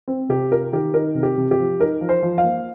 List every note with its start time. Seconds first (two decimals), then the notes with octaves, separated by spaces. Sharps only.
0.08 C4
0.29 C3 G4
0.51 F4 A#4
0.73 D#3 G4
0.94 D#4 A#4
1.15 C3
1.23 G4
1.38 C3
1.51 G4
1.59 F3
1.79 D#4 A#4
2.01 F3
2.09 C5
2.23 F3
2.38 F5
2.44 A#3